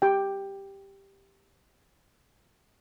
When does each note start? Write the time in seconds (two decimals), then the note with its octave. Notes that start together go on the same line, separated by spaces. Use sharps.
0.02 G4 G5